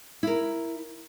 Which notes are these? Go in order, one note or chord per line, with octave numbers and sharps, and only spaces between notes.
E4 A#4